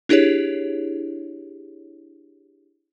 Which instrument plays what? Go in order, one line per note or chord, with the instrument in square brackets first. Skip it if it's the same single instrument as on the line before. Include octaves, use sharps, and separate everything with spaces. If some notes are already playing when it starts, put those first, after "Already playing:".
[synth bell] D4 E4 G4 G#4 C#5